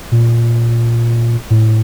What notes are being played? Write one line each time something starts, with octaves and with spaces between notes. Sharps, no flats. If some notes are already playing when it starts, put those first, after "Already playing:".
A#2
A2